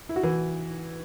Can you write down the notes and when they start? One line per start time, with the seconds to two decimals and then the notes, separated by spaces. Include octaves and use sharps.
0.09 E4
0.16 F#4
0.23 E3 E4